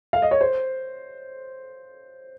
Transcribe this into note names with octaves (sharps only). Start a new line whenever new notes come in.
F5
D#5
C#5
C5